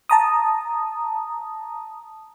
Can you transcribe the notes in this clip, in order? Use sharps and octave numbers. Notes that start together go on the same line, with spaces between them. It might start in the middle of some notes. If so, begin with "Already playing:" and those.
A5 A#5 D#6